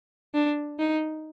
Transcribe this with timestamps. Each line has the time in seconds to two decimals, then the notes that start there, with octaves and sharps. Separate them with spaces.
0.35 D4
0.79 D#4